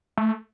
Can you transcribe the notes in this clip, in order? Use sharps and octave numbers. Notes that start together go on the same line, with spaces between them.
A3